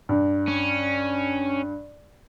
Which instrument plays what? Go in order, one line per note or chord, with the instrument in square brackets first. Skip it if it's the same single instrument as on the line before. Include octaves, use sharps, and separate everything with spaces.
[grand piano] G2
[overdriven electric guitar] C#4